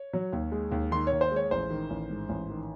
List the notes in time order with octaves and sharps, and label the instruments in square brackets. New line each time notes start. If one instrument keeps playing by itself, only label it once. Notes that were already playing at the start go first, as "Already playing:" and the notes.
Already playing: [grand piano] C#5
F#3
D#2
G#3
D#2
D#3 C6
C#5
D#2
C5
G#3
C#5
A1 C5
D#3
A1
G#2
A1
D#3